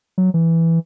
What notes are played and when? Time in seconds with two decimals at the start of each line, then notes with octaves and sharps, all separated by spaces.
0.18 F#3
0.34 E3